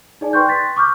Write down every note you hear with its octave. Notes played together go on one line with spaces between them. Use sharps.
D#4 G#4 D5 G#5 A5
B4 G5 C6 C#6 F#6 G6
C6 F#6 A6 B6
C#6 D6 E6 F6 G6